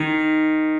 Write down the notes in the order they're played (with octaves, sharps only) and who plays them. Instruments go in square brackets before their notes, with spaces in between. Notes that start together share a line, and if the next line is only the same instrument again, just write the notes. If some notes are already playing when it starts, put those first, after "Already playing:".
Already playing: [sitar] D#3